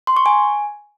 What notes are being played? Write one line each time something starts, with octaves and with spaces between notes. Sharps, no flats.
C6
C#6
G#5